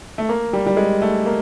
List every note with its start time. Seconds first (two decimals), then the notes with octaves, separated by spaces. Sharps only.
0.18 A3
0.29 A#3
0.53 G3
0.66 G3
0.77 G#3
1.02 A3
1.26 A#3